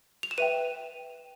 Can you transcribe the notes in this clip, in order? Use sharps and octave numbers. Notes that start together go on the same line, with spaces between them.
F7
E7
B4 E5 G5 D#7